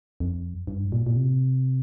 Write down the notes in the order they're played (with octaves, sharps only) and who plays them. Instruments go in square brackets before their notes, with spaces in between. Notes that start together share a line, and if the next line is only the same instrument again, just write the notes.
[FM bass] F2
G2
A#2
A#2
C3